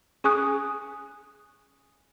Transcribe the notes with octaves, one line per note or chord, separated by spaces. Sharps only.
C#4 G#4 G#5 C#6 D#6 F#6